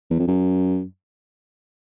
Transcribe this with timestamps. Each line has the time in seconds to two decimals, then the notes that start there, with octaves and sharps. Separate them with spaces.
0.11 E2
0.19 F2
0.28 F#2